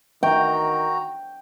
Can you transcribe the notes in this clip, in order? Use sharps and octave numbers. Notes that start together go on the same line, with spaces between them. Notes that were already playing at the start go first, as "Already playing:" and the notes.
D#3 F#4 G5 A#5